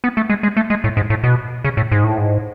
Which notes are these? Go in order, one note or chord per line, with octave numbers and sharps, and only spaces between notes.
B3
A3
G#3
G#3
A3
G#3
A2
G#2
A2
B2
C#3
A2
G#2
A2
G#2